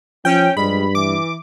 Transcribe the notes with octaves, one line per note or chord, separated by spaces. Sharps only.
F3 C#4 G5
G2 F3 G3 G#3 B5
E3 D6